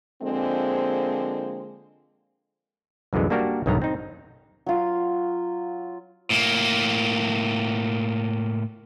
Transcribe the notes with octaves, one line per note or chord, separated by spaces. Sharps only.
D3 F3 G#3 A#3 C4
C2 F#2 D3 E3 G#3
G3 A#3 D4 F#4 G4 A#4
B1 E2 G2 D#3 B3 A#5
C4 D#4
F#3 F4
A2 A#3